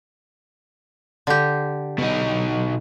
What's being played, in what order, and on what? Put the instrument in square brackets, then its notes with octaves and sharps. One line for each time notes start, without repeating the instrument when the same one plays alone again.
[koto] D3 G4
[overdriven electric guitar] B2 D#4